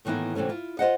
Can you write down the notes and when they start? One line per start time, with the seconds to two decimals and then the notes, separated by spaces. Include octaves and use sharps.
0.05 A2 D#3 E3 A#3 B3 E4
0.35 C3 E3 F#3 A3 C#4
0.49 E4 F4
0.79 F4 A4 C5 D#5 F5 F#5